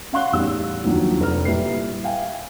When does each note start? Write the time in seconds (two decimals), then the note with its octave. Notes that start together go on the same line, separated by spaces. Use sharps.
0.13 C#4 F5 F#5 C6 F#6 G7
0.33 E2 A2 G3 D#4 E6
0.84 D#2 D3 F3 F#3
1.20 F1 B4 A#5 F6
1.45 A#2 G3 E4 B4 C7
2.03 E5 F5 G5 G#5